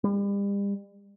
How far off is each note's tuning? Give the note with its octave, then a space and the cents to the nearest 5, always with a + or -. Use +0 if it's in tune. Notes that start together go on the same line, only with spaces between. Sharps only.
G3 +40